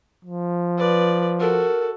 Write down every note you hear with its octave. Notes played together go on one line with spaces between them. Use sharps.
F3
B4 D5
F#4 A4 A#4